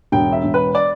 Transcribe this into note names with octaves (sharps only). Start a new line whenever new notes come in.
E1 G5
E5
E1
B4
D5